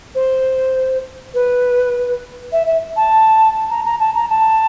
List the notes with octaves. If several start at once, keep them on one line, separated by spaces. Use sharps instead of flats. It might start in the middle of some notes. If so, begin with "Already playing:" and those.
C5
B4
E5
E5
A5
A#5
A#5
A5
A#5
A5